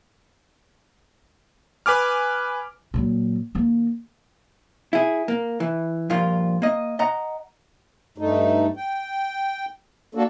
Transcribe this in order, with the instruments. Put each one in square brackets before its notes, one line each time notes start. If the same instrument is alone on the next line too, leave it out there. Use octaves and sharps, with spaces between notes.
[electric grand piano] B4 G#5 D6 F6
[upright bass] A#2 F#3
D#3 A#3
[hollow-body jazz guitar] E4 G#4
A#3
E3
G2 A#2 F3 A#3 F4
A#3 D#5
D#5 F#5 A#5
[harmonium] G2 A3 D#4
G5
A#3 D4 F#4 A4